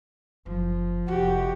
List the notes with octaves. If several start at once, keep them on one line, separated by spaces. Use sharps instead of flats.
F#1 F3
F1 F#4 G4 F#5